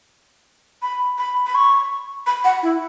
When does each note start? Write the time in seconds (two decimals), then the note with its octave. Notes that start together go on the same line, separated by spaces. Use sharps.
0.82 B5
1.18 B5
1.46 B5
1.55 C#6
2.27 B5
2.44 F#5
2.63 E4